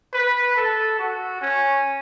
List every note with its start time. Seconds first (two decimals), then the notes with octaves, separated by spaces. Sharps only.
0.13 B4
0.56 A4
0.99 F#4
1.41 C#4